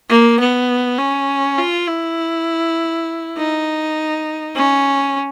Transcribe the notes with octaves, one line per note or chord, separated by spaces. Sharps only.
A#3
B3
C#4
F4
E4
D#4
C#4